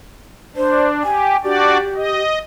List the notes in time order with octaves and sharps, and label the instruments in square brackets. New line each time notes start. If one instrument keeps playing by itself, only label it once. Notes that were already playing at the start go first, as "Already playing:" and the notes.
[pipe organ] D4 [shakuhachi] C5
[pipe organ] G4 [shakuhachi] G#5
[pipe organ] D4 F#4 D5 [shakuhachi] G4
[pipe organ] D#5